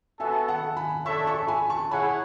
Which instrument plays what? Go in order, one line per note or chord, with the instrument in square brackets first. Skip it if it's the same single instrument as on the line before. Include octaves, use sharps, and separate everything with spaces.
[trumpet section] B3 F#4 A4 [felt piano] E5 G#5
[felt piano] F#5 A5
G#5 B5
[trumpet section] D4 A4 C#5 E5 [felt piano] A5 C#6
[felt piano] A5 C#6
G#5 B5
A5 C#6
[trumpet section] E4 G#4 C#5 F#5 [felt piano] G#5 B5